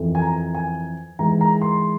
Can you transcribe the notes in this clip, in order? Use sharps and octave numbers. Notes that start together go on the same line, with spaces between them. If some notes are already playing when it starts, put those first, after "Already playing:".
Already playing: F2 E3
G#5
A#5
G#5
G#2 E3 A#5
A#5
C6